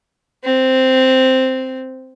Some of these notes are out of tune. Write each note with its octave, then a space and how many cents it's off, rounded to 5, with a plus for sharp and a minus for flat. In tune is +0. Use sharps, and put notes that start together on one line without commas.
C4 -5